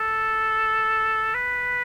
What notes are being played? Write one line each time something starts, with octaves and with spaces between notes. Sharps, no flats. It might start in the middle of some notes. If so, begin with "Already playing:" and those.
Already playing: A4
B4